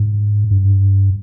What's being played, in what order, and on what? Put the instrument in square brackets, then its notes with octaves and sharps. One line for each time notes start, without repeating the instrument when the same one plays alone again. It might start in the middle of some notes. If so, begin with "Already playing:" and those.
Already playing: [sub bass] G#2
G2